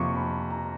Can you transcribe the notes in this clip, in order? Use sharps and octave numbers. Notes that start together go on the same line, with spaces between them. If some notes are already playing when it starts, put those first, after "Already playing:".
Already playing: F2 C3 F3 A#3 C#6 D6
B5
A#5